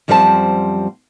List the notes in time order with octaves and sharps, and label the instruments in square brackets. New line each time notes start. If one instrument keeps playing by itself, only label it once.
[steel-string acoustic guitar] F#2 F3 G3 C4 C5 A5